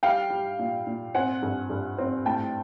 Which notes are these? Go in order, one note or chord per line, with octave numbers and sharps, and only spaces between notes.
G3 F5 G5
G3
A#2
A#2
C4 F#5 G#5
G2
G2
C4
A2 G5 A5